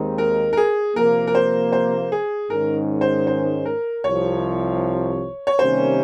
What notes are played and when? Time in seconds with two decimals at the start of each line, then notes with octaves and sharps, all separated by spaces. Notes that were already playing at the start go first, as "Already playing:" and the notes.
Already playing: D#2 D#3 G#3 C4 D#4
0.18 A#4
0.53 A#4
0.57 G#4
0.96 C3 F3 A#3 A#4
1.27 A#4
1.35 C5
1.72 C5
2.12 G#4
2.49 G#2 D#3 G#3 C#4 A#4
3.01 C5
3.27 C5
3.65 A#4
4.04 C2 C3 F3 C#5
5.47 C#5
5.59 C3 D#3 G3 A#3 C#4 C5